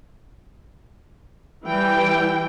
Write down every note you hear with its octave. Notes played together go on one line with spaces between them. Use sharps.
E3 G3 G5